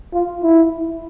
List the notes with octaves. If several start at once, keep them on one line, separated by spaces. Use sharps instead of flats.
F4
E4